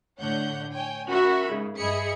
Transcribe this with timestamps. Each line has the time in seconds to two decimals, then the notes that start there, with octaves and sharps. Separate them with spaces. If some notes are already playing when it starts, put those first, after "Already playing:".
0.18 A2 D3 C#5 F#5 G6
0.73 C#5 G5 G#5
1.08 C#4 F#4 A#4 E5 B5
1.49 G#2 C#3
1.78 G2 G#4 D#5 E5 B5 C#7